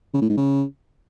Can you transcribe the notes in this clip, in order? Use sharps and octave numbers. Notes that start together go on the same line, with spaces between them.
C#3
A2
G#2
C#3